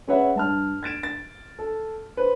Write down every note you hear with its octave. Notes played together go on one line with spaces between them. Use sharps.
C#4 G#4 B4 C#5 E5 F#5
G2 A5 F6
G#6 A6 D7 E7
A6
A4
B4 C5